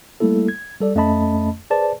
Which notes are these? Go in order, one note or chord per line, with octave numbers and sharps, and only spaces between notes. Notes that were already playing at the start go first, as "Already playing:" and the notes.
G3 A3 A#3 E4 A4
G#6
G3 A4 D5
F2 A3 C#4 D#5 A5 B5
G#4 B4 C5 D5 A5